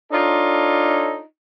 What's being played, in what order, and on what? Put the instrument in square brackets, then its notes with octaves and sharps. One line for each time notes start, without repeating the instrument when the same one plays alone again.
[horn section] D4 D#4 F4 A4 C#5